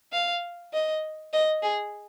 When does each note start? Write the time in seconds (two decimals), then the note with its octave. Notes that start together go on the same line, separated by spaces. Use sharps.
0.13 F5
0.74 D#5
1.33 D#5
1.62 G#4